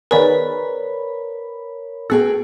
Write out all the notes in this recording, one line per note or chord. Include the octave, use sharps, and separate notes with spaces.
D#3 B3 G#4 A#4 B4 C#5 D5 B5
B3 F#4 G#4 A4 G5